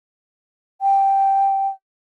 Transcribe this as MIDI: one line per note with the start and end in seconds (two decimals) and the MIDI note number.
0.82 1.68 79